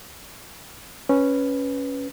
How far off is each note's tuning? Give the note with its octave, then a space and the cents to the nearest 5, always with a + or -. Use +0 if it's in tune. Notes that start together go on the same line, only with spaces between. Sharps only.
C#4 +0 B4 +0